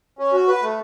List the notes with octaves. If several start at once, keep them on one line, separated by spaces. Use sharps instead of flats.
C#4
F#4
B4
A3